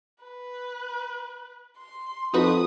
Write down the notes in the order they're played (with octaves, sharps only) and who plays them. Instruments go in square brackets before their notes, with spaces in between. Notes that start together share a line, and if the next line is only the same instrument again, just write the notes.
[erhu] B4
C6
[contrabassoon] F2 [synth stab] D#4 F#4 B4 [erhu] D#6